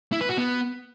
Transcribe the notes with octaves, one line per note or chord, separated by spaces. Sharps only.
E4
B4
F#4
B3